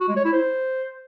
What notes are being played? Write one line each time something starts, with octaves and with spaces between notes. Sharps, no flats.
F#4
G#3
C#5
E4
C5